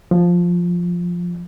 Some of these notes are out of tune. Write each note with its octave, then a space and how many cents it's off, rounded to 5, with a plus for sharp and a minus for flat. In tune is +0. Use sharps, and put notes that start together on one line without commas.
F3 +5